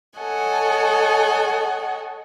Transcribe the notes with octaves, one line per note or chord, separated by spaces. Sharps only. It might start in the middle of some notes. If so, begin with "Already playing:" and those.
A4 C#5 D#5 F#5 G#5